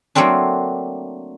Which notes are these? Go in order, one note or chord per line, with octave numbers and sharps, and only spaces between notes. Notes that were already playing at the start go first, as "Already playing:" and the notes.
F#3 A3 A#3 C4 D4